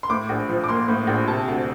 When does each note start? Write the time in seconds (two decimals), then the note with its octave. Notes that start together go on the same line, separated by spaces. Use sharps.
0.03 C6
0.10 A2 D6
0.29 A#1
0.49 F3
0.64 D6
0.68 A#3 C6
0.88 A2
1.07 A#1
1.27 C3 A5
1.48 D2